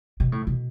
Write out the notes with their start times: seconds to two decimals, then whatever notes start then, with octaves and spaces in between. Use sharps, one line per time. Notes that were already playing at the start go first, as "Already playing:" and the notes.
0.20 B2
0.32 A2
0.47 B2